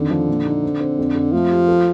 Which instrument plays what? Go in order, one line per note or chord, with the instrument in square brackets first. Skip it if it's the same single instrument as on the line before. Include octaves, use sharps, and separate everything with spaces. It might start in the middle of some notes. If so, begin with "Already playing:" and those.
Already playing: [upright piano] F2 D#3 [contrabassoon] D3
[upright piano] F3
A#2
D#4
C4
C4
F2
F2
[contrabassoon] F3 [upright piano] A3
[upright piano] G4
A4